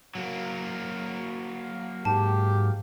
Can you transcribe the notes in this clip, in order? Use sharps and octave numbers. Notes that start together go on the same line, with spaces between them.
F#3 A#3
G#2 G4 A5